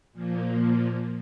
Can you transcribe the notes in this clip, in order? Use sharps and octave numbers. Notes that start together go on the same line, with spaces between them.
A#2 F3 A#3